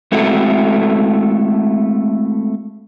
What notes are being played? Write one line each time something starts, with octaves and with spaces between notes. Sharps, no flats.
G#3 A3 C4 E4 F#4 A4